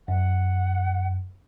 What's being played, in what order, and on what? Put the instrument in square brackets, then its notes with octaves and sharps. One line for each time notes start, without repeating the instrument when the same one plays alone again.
[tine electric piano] F#2 [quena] F#5